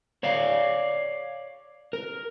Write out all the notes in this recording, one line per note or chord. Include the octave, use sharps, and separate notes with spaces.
C#5 D5 F5
A#4